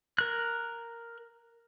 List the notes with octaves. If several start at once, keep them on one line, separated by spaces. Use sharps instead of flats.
A#4 F#6